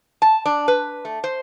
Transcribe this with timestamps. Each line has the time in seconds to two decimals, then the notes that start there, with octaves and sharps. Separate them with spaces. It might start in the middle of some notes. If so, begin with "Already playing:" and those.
0.22 A5
0.46 D4
0.68 B4
1.05 A3
1.24 C5